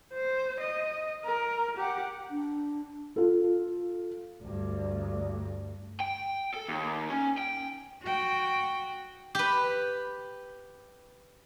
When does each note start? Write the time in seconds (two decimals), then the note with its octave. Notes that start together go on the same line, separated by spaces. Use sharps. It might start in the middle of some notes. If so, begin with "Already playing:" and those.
0.14 C5
0.60 D#5
1.25 A#4
1.77 G4 F#5
2.31 D4
3.16 F4 A4
4.42 D2 G2
6.00 G5
6.54 A4
6.68 D#2
7.10 C#4
7.37 G5
8.03 F#4 G5
9.35 G4 B4